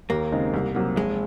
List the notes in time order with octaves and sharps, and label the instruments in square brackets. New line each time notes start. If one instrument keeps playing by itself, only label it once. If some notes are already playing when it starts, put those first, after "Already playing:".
[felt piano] D#2 [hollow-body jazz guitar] A#3
[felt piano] C#3 G#3 C4 D#4
C2
C3 F#3 A#3
[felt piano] F1 [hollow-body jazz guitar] G#3